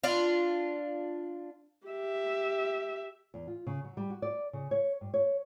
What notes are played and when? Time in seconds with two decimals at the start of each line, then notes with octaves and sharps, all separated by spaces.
0.03 D4 F4
1.87 G4 E5
3.34 E2
3.47 F4
3.67 C#3
3.84 F#3
3.97 G3
4.10 F#4
4.22 D5
4.53 C#3
4.71 C#5
5.01 G2
5.14 C#5